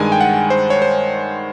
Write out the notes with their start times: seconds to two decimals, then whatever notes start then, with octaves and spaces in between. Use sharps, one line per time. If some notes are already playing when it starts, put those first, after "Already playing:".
Already playing: G2 D#3 G#3 G#5
0.12 G5
0.21 F#5
0.50 C5
0.70 C#5
0.82 C5